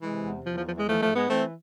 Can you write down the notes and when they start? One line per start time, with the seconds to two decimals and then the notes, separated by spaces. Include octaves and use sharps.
0.02 C3 E3 G#3
0.24 E2
0.44 E2 F3
0.55 F3
0.66 E3 F3
0.76 E3 G#3
0.87 E3 F3 A3
1.01 F3 A3
1.08 G#2
1.15 G#3 B3
1.29 E3 A3 C4